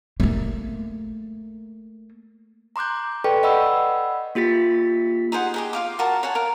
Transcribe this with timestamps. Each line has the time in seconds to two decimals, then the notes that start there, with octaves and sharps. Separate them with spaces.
0.20 A3 A#3
2.76 A#5 C6 D6 F#6 G6
3.24 A4 B4 D5 G5 C#6
3.43 D5 D#5 F#5 B5 E6
4.35 A#3 F4 G4 A6 B6
5.32 D#4 G#4 C5 F#5
5.54 G4 G#4 D#5
5.73 F4 F5 D6
5.99 F#4 A#4 A5
6.23 C#5 F#5 G#5 A5
6.35 A#4 F5